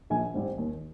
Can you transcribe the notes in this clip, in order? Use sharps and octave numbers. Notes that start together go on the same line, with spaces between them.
A#1 G#5
G#2 G3 C4
D#2